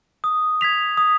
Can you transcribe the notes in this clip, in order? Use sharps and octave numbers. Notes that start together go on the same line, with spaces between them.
D#6
G#6 B6 F7
D#6